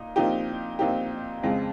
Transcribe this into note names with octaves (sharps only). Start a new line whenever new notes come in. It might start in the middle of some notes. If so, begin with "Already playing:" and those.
Already playing: A#2 D#4
A#2 F3 C4 D#4 G4
A#2 F3 C4 D#4 G4
F2 C#3 G#3 C4 F4